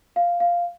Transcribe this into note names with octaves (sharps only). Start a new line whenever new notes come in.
F5
F5